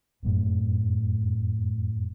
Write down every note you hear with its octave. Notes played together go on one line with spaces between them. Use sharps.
F1 F#2 A2